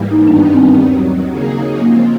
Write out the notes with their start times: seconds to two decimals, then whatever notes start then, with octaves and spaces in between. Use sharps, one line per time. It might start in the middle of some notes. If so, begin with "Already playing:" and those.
Already playing: G#2 E3 G3 A#3
0.11 D#4
0.27 G2 D#3 G3 B3 D4 D#4
0.53 C4
0.79 D#2 D#3 F#3
1.30 C#3 F#3 A#3 D#4 G#4
1.81 C#3 F3 G#3 A#3 C4 F4